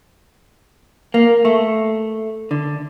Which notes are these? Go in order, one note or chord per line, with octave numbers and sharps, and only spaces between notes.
A#3
A3
D3